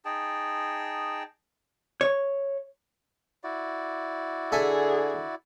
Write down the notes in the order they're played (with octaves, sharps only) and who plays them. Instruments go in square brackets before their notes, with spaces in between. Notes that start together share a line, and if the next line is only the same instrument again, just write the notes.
[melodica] D#4 G#4 G5 A5
[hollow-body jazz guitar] C#5
[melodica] E4 F#4 D5
[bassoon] D3 [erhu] G#4 [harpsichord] A4 E5 G#5